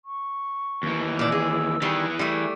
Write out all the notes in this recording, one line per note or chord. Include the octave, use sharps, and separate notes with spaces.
C#6
D#2 E3
A#2 D5 E6
G#4
D#3 E3 G3 G#4 B4
G3 A3